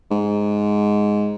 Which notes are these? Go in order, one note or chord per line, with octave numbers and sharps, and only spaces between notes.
G#2